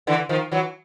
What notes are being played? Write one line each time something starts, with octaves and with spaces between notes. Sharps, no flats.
D3 E3
D#3 F3
E3 F#3